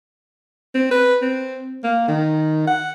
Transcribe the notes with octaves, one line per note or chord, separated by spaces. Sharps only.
C4
B4
C4
A#3
D#3
F#5